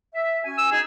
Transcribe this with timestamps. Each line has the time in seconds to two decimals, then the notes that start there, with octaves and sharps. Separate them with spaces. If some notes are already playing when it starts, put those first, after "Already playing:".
0.14 E5
0.43 C#4 F#4 G#5
0.58 E6
0.72 D#4 G#4